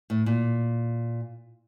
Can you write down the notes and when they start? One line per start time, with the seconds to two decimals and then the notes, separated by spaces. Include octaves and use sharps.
0.10 A2
0.26 A#2